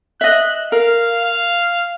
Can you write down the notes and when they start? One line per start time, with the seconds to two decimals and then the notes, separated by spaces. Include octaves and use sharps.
0.21 D#5 E5 F#6
0.72 A#4 F5
1.25 F5